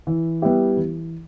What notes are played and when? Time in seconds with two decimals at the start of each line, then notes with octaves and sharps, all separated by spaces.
0.07 E3
0.42 G3 B3 E4 G4
0.77 E3